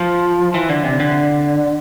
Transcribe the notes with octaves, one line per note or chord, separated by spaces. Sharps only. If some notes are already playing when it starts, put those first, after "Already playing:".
Already playing: F3
E3
D3
C3
D3